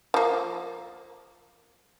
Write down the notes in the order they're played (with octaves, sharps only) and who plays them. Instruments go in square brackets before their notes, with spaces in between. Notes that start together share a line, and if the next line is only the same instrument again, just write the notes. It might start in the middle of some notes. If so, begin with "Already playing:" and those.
[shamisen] F3 A#3